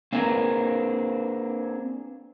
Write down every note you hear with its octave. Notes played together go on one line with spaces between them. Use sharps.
A#3 C4 D4 G#4 A#4 B4